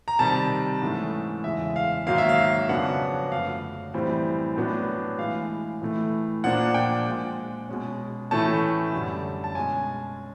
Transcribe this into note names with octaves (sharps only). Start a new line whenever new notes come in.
A#5
C3 D#3 G3 A5
G#2 E3 A3 C#4
E2 C#3 E3 G#3 E5
F5
G#2 D#3 F#3 A#3 F5
E5
F5
F2 C#3 F#3 B3 D4 F#5
F#2 D3 F3 A3 F5
A2 E3 G3 C4
A2 F#3 B3 D4
A2 E3 G#3 F5
A2 E3 A3
A#2 F3 A#3 D4 F#5
G5
A#2 F3 G#3
B2 G#3 C#4
A2 E3 A3 C#4 A5
F#2 D3 G3
A5
B2 G#3 C#4 G#5